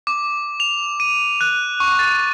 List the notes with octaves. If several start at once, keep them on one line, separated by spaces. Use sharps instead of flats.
D6
F7
D#7
F#6
C#6
A6